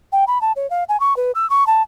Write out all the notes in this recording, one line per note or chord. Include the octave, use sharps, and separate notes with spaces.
G5
B5
A5
C#5
F5
G#5
C#6
B4
E6
C#6
A5